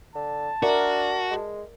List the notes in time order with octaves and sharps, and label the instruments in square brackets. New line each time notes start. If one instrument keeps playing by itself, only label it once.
[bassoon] D3 [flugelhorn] A5
[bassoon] D4 [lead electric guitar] F#4 [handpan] A#4 D5 E5
[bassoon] G#3